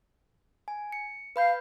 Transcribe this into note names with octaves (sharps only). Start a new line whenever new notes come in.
G#5
C#7
B4 F5 B5 G6